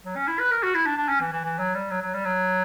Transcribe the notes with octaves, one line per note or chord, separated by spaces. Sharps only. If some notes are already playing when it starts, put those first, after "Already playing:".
F#3
C#4
E4
B4
A#4
F#4
E4
D4
D4
C#4
E3
E3
E3
F#3
G3
F#3
F#3
G3
F#3